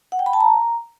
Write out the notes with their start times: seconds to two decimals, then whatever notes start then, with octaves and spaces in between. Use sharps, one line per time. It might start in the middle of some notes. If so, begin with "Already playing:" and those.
0.12 F#5
0.19 G5
0.26 B5
0.33 A5
0.41 A#5